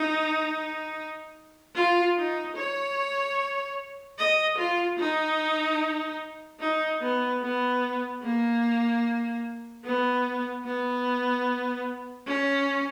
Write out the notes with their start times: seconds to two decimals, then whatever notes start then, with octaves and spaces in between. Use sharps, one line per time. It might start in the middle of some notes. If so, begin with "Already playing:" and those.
Already playing: D#4
1.75 F4
2.17 D#4
2.56 C#5
4.18 D#5
4.58 F4
4.99 D#4
6.60 D#4
7.01 B3
7.42 B3
8.23 A#3
9.84 B3
10.65 B3
12.26 C#4